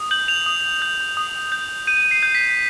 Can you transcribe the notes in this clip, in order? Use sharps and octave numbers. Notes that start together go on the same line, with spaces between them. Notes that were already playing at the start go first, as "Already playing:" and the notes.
Already playing: D#6
G6 F#7
F7
D#6
G6
D#6
G6
G6 D#7
C7
G6
B6